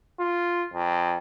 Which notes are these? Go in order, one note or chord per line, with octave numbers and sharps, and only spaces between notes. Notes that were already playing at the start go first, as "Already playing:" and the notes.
F4
F2